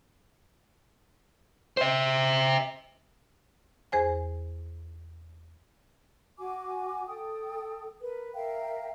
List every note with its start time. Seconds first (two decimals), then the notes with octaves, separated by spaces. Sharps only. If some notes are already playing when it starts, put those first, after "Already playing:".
1.77 C5 E5
3.92 E2 G#4 C5 G#5
6.38 F#4 G#5 D6
7.07 A4 G5 D#6
8.01 A#4 B4
8.35 A#4 E5 F5 G5